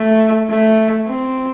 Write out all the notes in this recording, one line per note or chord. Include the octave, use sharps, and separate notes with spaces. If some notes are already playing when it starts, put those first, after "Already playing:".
Already playing: A3
A3
C4